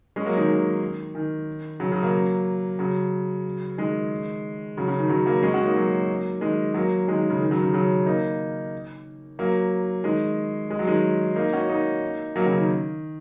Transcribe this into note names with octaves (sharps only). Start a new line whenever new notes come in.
G#3 C#4
F#3 A#3
D#3 G#3
D#3
D#3
C#3 F#3
C#3 F#3
F#3 A#3
C#3 F#3
D#3 G#3
C#3 F#3
C#3 F#3
D#3
C#3 F#3
F#3 A#3
G#3 C#4
C#4 F#4
A#3 D#4
F#3 A#3
D#3 G#3
F#3 A#3
D#3 G#3
D#3
C#3
D#3
C#3 F#3
C#3
C#3 F#3
A#3 D#4
F#3 A#3
D#3 G#3
G#3
F#3
D#3 G#3
A#3 D#4
C#4 F#4
A#3 D#4
F#3 A#3
C#3 F#3
D#3